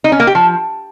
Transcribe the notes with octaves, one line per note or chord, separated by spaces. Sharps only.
D#4
C#4
A#3
G4
F3